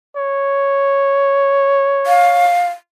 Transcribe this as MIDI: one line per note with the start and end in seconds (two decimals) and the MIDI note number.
0.17 2.53 73
2.06 2.67 77